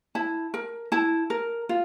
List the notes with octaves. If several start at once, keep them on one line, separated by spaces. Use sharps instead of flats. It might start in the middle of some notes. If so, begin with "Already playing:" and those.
E4 A5
A#4
E4 A5
A#4
F4